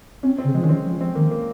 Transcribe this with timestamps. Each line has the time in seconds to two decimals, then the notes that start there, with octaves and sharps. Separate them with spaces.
0.23 C4 C#4
0.38 C4
0.44 C#3
0.54 F3 G#3
0.63 D#3 C#4
0.69 C4
0.85 F3
1.01 C4
1.15 D#3 A#3
1.31 A#3